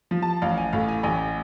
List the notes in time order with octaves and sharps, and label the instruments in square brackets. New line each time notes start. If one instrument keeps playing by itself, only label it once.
[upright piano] F3
A5
A1 F5
G#5
A2 F5
G#5
A1 G#5